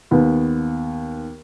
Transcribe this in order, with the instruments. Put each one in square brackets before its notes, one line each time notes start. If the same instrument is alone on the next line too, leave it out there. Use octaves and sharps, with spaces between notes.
[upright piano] D#2 B3